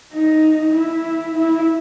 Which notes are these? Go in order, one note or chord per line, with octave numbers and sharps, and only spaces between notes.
D#4
E4
E4